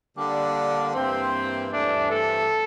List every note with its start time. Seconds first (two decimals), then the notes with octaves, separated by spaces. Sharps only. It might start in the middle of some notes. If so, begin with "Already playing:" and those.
0.16 D3 G3 A#3 D4
0.94 G2 E3 A#3 C4
1.71 G2 E3 A3 C4 D4
2.10 A4